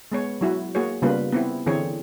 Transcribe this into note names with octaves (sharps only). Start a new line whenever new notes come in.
G#3 B3 C#5
F#3 E4 F#4
A#3 F#4 G#4 C#5
C#3 G3 A#3 B3 F4 B4
B3 C4 E4
D3 E3 C4 G#4 C#5